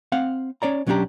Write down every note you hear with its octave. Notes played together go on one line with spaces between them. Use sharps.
C4 F5 F#5
C#4 C#5 D5 A#5
B1 F#3 C#4 D4 G4 A#5